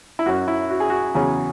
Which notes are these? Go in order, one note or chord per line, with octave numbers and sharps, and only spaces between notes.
E4
F#2 F#3 C#4 F#4
E4
F#4
G#4
F#4
E2 C#3 F#3 C#4 G#4